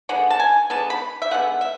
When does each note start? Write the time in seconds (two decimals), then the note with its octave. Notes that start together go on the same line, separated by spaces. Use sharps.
0.09 D3 G#3 B3 F#5
0.30 A5
0.40 G#5
0.70 D3 G#3 B3 A5
0.90 B5
1.22 E5
1.31 D3 G#3 B3 F#5
1.61 E5